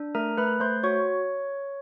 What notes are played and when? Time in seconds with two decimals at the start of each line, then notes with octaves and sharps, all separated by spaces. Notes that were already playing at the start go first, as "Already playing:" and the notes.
Already playing: D4
0.15 A3 A#4 A#5
0.38 A3 B4 B5
0.60 A3 C5 C6
0.84 F#4 C#5 C#6